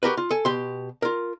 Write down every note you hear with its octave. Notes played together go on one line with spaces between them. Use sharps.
F#4 G4 A#4 B4
F4
A4 G#5
B2 G4 C6
F4 A#4